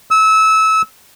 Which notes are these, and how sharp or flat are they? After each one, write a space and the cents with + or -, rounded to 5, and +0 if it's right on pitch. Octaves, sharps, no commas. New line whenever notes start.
E6 -25